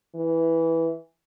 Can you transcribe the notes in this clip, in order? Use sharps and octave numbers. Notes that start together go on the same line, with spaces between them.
E3